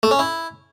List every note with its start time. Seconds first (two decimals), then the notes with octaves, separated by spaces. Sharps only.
0.03 A3
0.11 C#4
0.19 E4